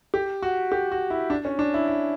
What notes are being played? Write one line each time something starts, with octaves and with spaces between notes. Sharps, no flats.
G4
F#4
G4
F#4
E4
D4
C#4
D4
E4
E4